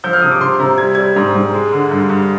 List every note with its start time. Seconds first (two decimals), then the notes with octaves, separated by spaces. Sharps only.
0.04 F3 G6
0.13 F6
0.22 C3 D#6
0.32 D6
0.41 C3 C6
0.60 C3 A#5
0.78 G3 G#6
0.95 G3 G#6
1.16 G#2
1.35 G#2
1.54 G#3
1.73 D3
1.91 G2
2.09 G2